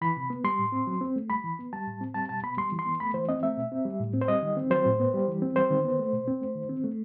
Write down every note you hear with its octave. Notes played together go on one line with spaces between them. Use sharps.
E3 B5
C3
B3
G3 C6
A2
C4
F#3
C4
A3
G3 B5
E3
B3
G3 A5
A2
C4
G3 A5
B2 A5
B3 B5
G3 C6
E3
C6
B3
A3 B5
E3 C5
C4 D#5
A3 E5
B2
C4
G3
A2
C4
C5
G3 D#5
D#3
C4
F#3 C5
A2
B3
G3
E3
C4
G3 C5
D#3
B3
A3
B2
C4
A3
D#3
C4
A3